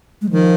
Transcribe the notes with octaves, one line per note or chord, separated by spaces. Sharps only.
G#3
D#3 F3